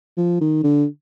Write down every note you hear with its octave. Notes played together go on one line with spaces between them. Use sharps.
F3
D#3
D3